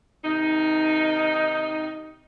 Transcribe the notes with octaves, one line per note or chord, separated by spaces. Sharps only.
C3 D#3 D#4